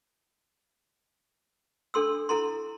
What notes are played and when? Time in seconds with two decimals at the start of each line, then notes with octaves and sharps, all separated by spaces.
1.94 D4 A4 C6 E6
2.29 E4 A4 A#5 C6